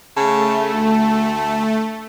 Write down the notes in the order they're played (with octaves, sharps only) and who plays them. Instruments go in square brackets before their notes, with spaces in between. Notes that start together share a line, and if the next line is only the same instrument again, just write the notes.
[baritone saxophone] C#3 [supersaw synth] A3 [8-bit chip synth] A5
[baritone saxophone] D2